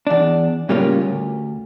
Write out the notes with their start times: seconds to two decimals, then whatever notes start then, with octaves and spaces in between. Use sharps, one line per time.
0.07 E2 D4
0.69 A2 C#3 G3 A#3 C#4 F4
1.01 D2